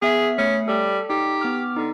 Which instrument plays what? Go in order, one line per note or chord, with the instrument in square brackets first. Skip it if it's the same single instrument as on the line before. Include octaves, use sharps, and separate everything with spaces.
[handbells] B3 E5 B6 [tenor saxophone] G#4
[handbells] A3 [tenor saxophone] C#4
[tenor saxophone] G3 [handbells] A4
[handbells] D#4 [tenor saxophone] G4
[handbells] B3 D6 F6
[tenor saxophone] D3 [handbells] D#4